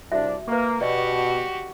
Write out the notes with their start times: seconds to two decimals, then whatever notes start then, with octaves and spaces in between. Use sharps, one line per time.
0.12 C2 D4 F#4 E5
0.48 A#3 B4 C#6
0.81 B2 F#4 G4 D5 D#5